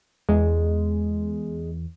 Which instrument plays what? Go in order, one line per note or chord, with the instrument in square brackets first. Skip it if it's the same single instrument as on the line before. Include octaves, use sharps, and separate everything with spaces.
[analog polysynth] E2 [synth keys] G#3